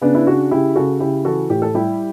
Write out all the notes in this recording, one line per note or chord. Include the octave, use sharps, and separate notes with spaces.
C#3 B3 D4
E4
C#3 D4 F#4
C#3 E4 G4
C#3 F#4 A4
C#3 E4 G4
E3 F#4 A4
A2 G4
A4
G3 E4 G4